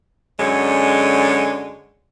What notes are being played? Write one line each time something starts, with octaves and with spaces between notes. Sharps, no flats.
F#2 D3 F#3 G#3 C#5